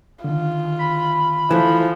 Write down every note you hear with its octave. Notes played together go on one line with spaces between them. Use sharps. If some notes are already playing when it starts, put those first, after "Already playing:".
D3 D#3 F4
B5
E3 F3 A3